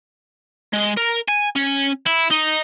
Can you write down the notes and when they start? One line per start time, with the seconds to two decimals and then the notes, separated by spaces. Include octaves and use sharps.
0.73 G#3
0.97 A#4
1.28 G#5
1.56 C#4
2.07 E4
2.31 D#4